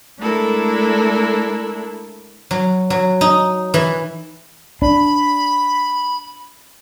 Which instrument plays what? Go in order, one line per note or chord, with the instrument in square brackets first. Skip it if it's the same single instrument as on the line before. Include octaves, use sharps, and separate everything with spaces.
[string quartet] G#3 A3 D4 E4 A4 A#4
[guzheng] F#3
F#3
D#4
E3
[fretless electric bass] D4 [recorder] B5